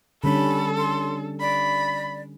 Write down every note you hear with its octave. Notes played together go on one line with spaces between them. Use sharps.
D3 G3 C#4 A4 B5
C6
D5 B5